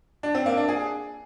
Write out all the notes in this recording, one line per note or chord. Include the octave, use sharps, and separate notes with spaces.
D4
C4
A#3
D4
G#4